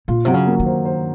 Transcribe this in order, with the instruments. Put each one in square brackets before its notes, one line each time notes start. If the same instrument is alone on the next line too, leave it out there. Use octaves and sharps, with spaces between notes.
[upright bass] A#2 [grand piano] F4
[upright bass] C3 [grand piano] F#3
[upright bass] C#3
[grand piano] A#3
[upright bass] D#3
[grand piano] C5
C5